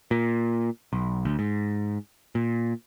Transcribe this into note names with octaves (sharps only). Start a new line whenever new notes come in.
A#2
B1
D2
G#2
A#2